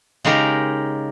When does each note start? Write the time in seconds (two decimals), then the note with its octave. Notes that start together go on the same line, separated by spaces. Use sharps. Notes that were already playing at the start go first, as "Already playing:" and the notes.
0.25 C#3 G#3 D#4 G4 A#4